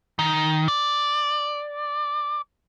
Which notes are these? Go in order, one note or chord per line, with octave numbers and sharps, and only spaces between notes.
D#3
D5